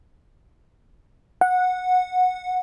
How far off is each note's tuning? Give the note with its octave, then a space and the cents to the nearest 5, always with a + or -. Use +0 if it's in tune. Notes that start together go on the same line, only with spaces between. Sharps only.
F#5 -15